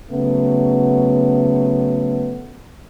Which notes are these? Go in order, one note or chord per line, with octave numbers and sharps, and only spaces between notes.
C#3 F#3 A3 B3